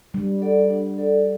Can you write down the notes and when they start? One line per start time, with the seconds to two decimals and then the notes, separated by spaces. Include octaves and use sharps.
0.14 G3 D4
0.42 A4 D5 F#5
0.70 D4
0.98 A4 D5 F#5